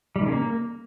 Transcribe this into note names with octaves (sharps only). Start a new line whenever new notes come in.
G3
D#3
C#3
A#3